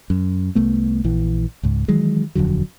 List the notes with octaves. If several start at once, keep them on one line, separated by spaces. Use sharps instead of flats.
F#2
C2 A3 B3
A#1 E3
C#2 G#2
D#3 E3 F#3 G#3
D#1 F2 D3 F#3